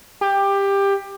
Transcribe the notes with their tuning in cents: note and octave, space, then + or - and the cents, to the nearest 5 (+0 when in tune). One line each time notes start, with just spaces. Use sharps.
G4 +15